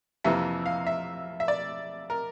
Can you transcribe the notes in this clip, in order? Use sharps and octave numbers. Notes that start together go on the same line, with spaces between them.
F2 C3 E3 A#3 E5
F5
E5
E5
D5
A#4